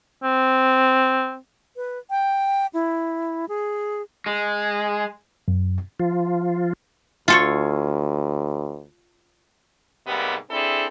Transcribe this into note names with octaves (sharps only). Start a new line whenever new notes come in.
C4
B4
G5
E4
G#4
G#3
F#2
F3 F4
D2 F4 A4 C#5
G#2 C3 G3 A#3 B3
C4 D4 E4 G#4 A4